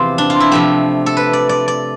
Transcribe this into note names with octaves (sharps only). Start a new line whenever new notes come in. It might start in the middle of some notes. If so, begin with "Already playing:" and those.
Already playing: E2 C3 F3 B3 C4 F4 G4
D4
F4
E4
C3 F3 A3 G4
A4
B4
D5
D5
D5